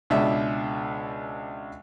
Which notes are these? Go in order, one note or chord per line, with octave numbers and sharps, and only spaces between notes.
C#2 B2 D4 E5